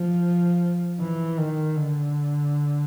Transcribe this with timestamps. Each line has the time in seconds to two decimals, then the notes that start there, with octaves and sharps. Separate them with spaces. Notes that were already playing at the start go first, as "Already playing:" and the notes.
Already playing: F3
1.00 E3
1.38 D#3
1.77 D3